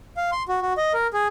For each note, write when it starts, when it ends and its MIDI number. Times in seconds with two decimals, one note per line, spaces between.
0.17 0.30 77
0.32 0.43 84
0.48 0.60 66
0.62 0.73 66
0.78 0.92 75
0.94 1.07 70
1.13 1.28 68